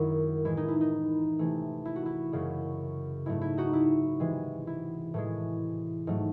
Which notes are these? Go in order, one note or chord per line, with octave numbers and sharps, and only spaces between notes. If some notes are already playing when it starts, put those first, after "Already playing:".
Already playing: F#2 D#3 G#3 E4
A2 E3 G#3 E4
D#4
E4
D#4
C3 E3 A3
E4
F#4
E4
F#2 C#3 G#3
G#2 F#3 A3 E4
E4
D#4 F#4
E4
C3 E3 G#3
E4
A2 E3 G#3
G#2 F#3 A3